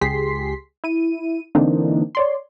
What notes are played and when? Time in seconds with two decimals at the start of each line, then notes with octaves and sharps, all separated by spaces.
0.01 C#2 G4 G#4 C6 B6 C7
0.84 E4 D#7
1.55 D3 E3 A#3 C4 D4 D#4
2.15 C#5 D5 C6